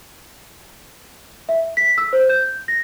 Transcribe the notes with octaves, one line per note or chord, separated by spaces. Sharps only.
E5
B6
E6
C5
G6
A#6